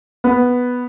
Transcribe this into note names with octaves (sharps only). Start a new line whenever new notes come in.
B3